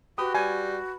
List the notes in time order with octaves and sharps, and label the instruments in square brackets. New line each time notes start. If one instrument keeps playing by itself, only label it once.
[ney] F#4 [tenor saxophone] G4 [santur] B4 [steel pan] D#6
[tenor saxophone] G3 [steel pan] G#5